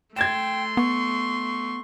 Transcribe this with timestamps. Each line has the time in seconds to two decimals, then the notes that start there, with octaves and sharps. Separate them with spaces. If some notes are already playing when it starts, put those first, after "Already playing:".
0.16 A3 G5 C6 G#6 A6 E7
0.77 B3 C#6